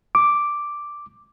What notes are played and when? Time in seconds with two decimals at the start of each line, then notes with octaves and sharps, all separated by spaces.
0.15 D6